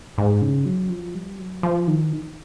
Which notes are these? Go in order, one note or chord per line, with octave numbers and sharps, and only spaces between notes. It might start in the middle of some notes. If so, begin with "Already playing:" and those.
G#2
C#3
F#3
F3
G3
F#3
F3
D#3